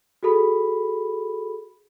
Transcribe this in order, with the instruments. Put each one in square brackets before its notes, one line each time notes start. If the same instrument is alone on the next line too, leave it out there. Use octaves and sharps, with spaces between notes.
[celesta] F#4 G#4 A4 B5